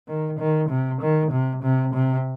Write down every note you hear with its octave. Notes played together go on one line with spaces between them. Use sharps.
D#3
D#3
C3
D#3
C3
C3
C3